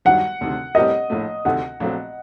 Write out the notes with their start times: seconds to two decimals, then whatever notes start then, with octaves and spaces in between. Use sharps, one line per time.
0.05 G2 D#3 F#3 F#5
0.41 D2 C3 D#3
0.75 A2 G3 C4 G4 A#4 D#5
1.10 A#1 A2 A3
1.45 D2 C3 D#3 A3 F#5
1.80 A#1 A#2 F#3 A3 C4